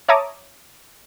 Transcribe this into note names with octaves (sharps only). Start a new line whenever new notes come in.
C#5 E5 A5 A#5 D6 D#6